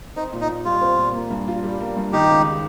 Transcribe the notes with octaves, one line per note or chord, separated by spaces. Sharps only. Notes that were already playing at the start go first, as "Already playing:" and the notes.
C4 D#4
A#2
D#4
A#2
G3 F4
C4
A#2
A#3
G2
F4
G3
A#3
G2
D#3 D#4 G4
C#2